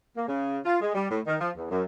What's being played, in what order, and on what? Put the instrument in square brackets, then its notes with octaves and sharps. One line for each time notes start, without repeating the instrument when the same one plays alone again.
[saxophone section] A#3
C#3
F4
G#3
G3
A2
D#3
F3
E2
F#2